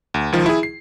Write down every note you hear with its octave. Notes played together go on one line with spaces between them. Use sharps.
D2
C#2 D#3 F3
E4 G#4
C7